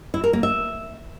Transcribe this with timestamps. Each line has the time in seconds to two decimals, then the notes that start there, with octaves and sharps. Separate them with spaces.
0.14 E4
0.24 A#4
0.33 A#3
0.43 E5